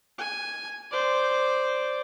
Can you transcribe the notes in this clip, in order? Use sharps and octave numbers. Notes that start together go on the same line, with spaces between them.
G#5
C5 D5